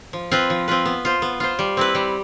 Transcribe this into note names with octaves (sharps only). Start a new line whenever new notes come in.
F3
C4 F4 B4
F3
C4 F4 B4
B3
F4 C5
B3
F4 C5
G3
C4 E4 B4
G3